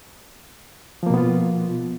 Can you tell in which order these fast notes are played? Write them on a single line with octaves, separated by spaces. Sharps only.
F3 A#3 B2 B3 F4